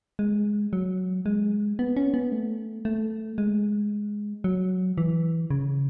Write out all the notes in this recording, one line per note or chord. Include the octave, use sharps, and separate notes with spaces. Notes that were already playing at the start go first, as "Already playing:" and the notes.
G#3
F#3
G#3
B3
C#4
B3
A3
A3
G#3
F#3
E3
C#3